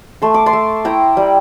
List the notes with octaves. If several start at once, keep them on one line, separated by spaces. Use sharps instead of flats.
A3 C6
D6
A5 C6
A3
E4 G5 A#5
G3